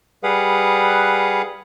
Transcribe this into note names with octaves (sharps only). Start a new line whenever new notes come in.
G3 G#4 B4 F5 F#5